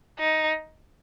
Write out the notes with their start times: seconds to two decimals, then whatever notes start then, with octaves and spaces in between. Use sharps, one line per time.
0.19 D#4